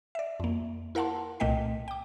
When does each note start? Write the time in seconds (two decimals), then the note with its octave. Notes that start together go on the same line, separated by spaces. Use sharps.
0.15 D5 E5
0.40 F2 A#3
0.95 E4 A#4 F5 F#5 A5 C6
1.40 C2 A#2 A3 D#5 G5 B6
1.88 G5 D6